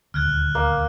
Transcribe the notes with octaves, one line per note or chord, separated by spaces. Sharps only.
D#1 G#1 D2 F6 F#6 G#6
A#3